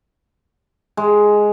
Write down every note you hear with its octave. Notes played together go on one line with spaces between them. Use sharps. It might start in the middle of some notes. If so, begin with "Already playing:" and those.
G#3